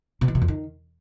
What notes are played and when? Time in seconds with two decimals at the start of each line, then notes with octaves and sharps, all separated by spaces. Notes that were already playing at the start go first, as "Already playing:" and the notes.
0.21 B2
0.28 E3
0.35 B2
0.42 F2
0.48 D#3